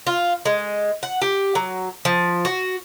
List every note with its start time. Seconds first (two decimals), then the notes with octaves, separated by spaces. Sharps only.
0.07 F4
0.45 G#3
1.03 F#5
1.22 G4
1.55 F#3
2.05 F3
2.45 F#4